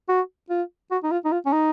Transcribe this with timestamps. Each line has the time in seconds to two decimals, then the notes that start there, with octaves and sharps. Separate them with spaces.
0.08 F#4
0.50 F4
0.91 F#4
1.03 D#4
1.11 F4
1.25 D#4
1.32 F4
1.46 C#4
1.53 D#4